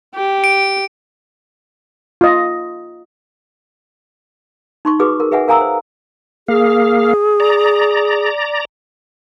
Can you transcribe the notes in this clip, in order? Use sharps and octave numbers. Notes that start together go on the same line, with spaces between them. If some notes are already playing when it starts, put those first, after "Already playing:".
G4
D7
F4 D#5
D#4 C6 C#6
F#4 G#4 B4 D6 D#6
A#4
G#4 B4 E5 F#5 G#5
A#4 F5 G#5 A#5 D#6 E6
C5
A#3 G#4 F5
D5 A#5